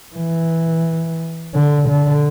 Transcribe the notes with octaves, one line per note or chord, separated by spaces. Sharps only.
E3
D3
D3